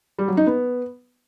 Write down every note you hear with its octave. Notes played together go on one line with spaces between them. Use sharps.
G3
F#3
D#4
B3